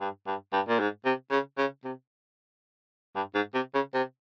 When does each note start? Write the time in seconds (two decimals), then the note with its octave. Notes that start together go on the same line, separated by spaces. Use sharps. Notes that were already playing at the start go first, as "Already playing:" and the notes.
0.01 G2
0.27 G2
0.53 G2
0.68 A#2
0.80 G#2
1.05 C3
1.31 C#3
1.58 C#3
1.84 C3
3.15 G2
3.35 G#2
3.54 C3
3.74 C#3
3.94 C3